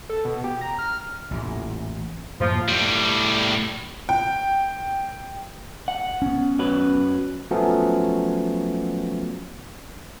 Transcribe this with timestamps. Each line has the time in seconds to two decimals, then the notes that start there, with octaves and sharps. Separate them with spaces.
0.09 A4
0.25 B2
0.44 G4
0.61 A#5
0.79 F6
1.31 A1 E2 A#2
2.40 F#2 A2 F3 A#3
2.68 A2 G3
4.09 G5
5.88 F#5
6.22 B3 C#4
6.59 F#2 F#3 B4
7.51 F3 F#3 A3 B3 C#4